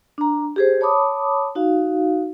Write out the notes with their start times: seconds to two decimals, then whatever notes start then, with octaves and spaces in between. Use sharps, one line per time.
0.18 D4 A#5
0.56 G4 G#4 C5
0.81 C#5 A5 B5 D6 D#6
1.55 D#4 F#4 F5